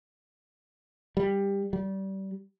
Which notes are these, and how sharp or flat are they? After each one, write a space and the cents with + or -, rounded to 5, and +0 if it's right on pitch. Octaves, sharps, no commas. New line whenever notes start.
G3 +15
G3 -25